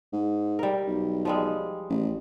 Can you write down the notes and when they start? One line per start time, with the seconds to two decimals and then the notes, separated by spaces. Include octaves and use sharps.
0.13 G#2
0.59 G3 A#4
0.87 B1
1.25 F3 G3 G#3
1.89 A1